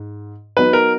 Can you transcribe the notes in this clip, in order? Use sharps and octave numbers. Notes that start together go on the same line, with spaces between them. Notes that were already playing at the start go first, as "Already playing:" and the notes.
Already playing: G#2
F#3 B3 D#4 B4
A#4